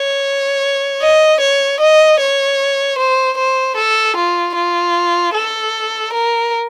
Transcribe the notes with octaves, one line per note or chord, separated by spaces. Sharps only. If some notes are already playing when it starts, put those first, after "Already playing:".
Already playing: C#5
D#5
C#5
D#5
C#5
C5
C5
A4
F4
F4
A4
A#4